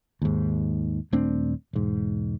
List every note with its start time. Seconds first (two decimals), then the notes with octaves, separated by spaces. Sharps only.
0.22 D#2 G#2
1.13 D#1 A3 C4 D4
1.73 E1 G#2